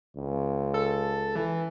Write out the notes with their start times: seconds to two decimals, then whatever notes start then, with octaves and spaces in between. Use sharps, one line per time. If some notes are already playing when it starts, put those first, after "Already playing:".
0.17 C#2
0.74 A4
1.36 E3